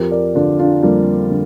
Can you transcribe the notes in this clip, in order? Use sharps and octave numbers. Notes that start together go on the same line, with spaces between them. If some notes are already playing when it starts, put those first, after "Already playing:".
Already playing: F2 G4 A#4
A#4 D5
D3 D4 F4
D4 F4
F2 G3 A#3
D3